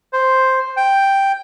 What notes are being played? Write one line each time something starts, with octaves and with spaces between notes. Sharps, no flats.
C5
G5